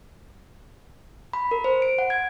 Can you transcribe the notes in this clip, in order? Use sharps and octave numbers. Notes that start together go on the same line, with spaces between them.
B5
A#4
C5
D7
F#5
G#6